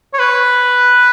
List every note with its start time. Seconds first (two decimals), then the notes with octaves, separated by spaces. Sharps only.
0.13 C#5
0.19 B4